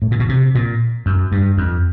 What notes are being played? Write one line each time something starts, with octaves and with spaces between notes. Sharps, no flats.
A2
A#2
B2
C3
A#2
F#2
G2
F2